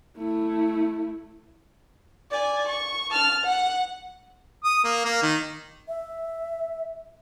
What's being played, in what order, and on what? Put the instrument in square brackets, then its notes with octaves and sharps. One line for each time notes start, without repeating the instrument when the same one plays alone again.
[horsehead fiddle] A3 E4
[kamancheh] D5 G#5
C#6
A5 F6
F#5
[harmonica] D#6
A#3
A#3
D#3
[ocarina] E5